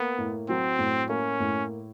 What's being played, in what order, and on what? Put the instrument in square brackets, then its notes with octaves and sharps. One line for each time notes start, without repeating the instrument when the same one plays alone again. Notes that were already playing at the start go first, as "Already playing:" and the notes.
Already playing: [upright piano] A#3 [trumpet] B3
[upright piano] A2
[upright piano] F#3 [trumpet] C4
[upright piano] A2
[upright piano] A#3 [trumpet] C#4
[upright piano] A2